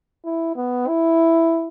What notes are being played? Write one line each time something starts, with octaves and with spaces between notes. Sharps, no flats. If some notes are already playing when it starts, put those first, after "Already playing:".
E4
B3
E4